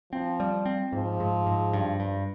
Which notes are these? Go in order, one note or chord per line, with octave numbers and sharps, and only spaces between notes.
F3 C4
G3
C4
G#2 F3
G#2
G#2
G2
G2